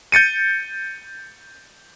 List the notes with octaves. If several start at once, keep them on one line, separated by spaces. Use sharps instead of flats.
G6 A6 C#7 D#7